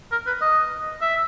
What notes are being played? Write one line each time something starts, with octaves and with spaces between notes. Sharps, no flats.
A#4
B4
D#5
E5